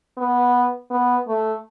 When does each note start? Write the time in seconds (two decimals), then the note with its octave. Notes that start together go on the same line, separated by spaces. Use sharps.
0.17 B3
0.91 B3
1.28 A3